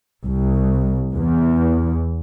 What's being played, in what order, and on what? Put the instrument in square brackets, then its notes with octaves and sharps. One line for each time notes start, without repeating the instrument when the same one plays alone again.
[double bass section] C2
E2